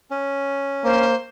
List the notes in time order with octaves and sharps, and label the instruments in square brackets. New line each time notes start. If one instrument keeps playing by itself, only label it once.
[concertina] C#4
[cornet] A#3 [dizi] C5